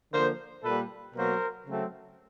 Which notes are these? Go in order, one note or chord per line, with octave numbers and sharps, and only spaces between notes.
D3 F3 A#3 A#4 C5
A#2 G3 A#3 A4 B4
B2 F#3 A#3 A#4 C5
C#3 F#3 A3 C4